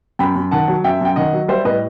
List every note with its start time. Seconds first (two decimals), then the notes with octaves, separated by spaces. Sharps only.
0.19 F#2 G5 B5
0.36 F#2
0.51 D#3 F#5 A5
0.68 F#3
0.84 F#2 E5 G5
1.01 F#2 G5
1.16 D#3 D#5 F#5
1.33 F#3
1.48 G3 C5 E5
1.65 A2 B4 D#5